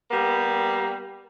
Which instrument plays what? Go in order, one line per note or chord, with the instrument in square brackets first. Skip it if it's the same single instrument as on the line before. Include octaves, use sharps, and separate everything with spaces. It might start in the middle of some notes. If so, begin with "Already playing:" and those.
[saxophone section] G3 A#3 B3